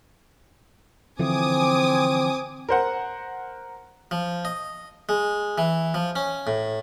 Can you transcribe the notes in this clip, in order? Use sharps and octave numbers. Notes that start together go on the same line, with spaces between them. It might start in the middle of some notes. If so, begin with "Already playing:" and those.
D3 E3 F3 C4 G#5 D6 D#6
A#4 C5 F#5
F3
D#5
G#3
E3
F3
C#4
A2